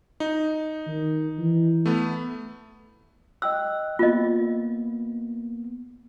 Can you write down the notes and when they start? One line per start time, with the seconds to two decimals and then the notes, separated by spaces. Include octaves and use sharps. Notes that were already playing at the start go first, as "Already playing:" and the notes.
0.20 D#4
0.87 D#3
1.38 E3
1.86 A3 B3
3.42 D#5 G5 E6 F#6
3.99 A#3 B3 F4 D#5